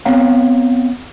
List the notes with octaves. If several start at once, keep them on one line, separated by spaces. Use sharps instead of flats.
B3 C4 C#5 F5 F#5 A#5